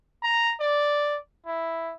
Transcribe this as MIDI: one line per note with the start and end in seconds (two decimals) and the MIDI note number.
0.23 0.54 82
0.60 1.17 74
1.46 1.93 64